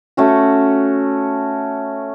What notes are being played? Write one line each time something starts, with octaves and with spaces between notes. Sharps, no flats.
A3 C#4 F#4